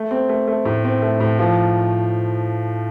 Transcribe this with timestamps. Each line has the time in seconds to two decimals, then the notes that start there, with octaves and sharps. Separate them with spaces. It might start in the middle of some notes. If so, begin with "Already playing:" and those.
Already playing: A3
0.11 C4
0.29 A3
0.47 A3
0.65 A2
0.84 C4
1.02 A3
1.20 A2
1.39 F3